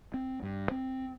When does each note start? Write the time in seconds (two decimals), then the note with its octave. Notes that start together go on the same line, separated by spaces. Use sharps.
0.14 C4
0.43 G2
0.71 C4